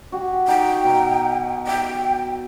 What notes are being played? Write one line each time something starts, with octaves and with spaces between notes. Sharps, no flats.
F#4 G4
D#4 F#5 G5
B2 A#5
E5 G5